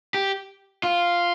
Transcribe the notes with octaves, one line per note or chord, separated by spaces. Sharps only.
G4
F4